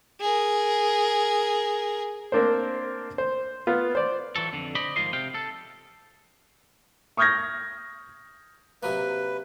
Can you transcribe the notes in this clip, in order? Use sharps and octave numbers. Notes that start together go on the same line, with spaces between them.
G#4 A#4
A#3 C4 D4 A#4 C5
C5
B3 F4
C5 D5
E3 F#3 A4
F2 D3
C5 D5 D#5 B5
G#2 D#3 F3 F4 D#5 C6
C3 F5 G5
A4
C#6 D#6 F6 G6 G#6 A#6
C3 F#3 A#3 B4